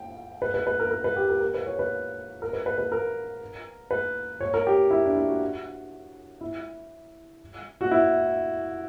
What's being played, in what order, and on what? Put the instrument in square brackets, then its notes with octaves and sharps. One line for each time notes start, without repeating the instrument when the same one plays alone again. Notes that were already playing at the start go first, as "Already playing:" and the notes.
Already playing: [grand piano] G5
B4
B4
B4
A#4
A#4
B4
G4
A#4
A#4
B4
C#5
B4
A#4
B4
B4
B4
A#4
B4
C#5
A#4
G4
E4
D4
E4
F#4
E4
F#4
E4